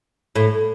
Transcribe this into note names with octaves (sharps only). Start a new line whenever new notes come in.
A2